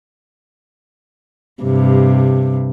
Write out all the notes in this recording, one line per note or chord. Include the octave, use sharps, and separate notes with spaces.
G2 C3